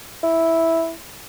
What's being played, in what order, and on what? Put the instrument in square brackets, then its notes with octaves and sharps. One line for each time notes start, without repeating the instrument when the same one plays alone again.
[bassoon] E4